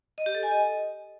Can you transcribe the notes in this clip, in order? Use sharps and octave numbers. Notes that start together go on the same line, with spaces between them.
D#5
G4
A4
G#5
D#5